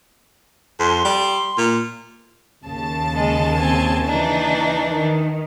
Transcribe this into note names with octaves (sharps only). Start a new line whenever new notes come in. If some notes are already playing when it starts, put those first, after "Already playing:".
F2 C6
G3
A#2
D#2 C#3 A5
G#3
C4 G#5
E3 D4 D#4
D#3